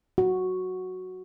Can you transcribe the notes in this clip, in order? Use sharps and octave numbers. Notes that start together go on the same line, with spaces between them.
F#4